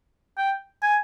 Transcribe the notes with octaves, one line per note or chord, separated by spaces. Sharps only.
G5
G#5